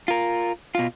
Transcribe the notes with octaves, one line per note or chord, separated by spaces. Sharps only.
F4 A#4
B2 F4